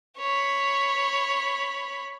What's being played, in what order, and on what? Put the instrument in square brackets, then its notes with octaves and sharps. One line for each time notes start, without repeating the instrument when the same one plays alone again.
[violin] C#5 B5